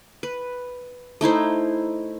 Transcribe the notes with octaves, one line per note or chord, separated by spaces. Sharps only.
B4
A3 D#4 E4 C5